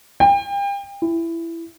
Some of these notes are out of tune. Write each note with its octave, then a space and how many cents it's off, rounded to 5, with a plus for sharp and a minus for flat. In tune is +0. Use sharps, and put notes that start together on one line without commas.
G5 +35
E4 +15